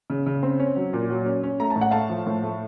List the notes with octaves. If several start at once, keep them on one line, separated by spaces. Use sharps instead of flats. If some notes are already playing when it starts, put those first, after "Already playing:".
C#3
C#3
C4
C#4
F#3
A#2
F#3
C#4
C#4
A3 A#5
A5
A2
F#5
A3 F5 A5
F3
A2
A3